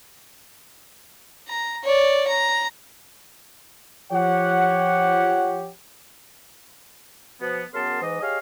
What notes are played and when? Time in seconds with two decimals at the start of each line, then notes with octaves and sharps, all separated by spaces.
1.48 A#5
1.84 C#5 D5
2.27 A#5
4.12 F3 G4 C#5 F#5
7.40 B2 F3 B3
7.74 F#2 C#3 B3 A#4 A5 C6
8.02 G#2 E3 D#5
8.21 G4 G#4 C#5 D#5 F5